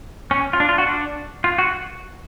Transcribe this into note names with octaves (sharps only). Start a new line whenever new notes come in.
C#4
F4
D4
F4
F#4
D4
F4
F#4